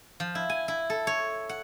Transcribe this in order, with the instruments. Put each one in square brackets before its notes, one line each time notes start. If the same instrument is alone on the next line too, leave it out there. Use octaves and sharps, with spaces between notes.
[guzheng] F3
E4
G#5
E4
A4
C#5
F#5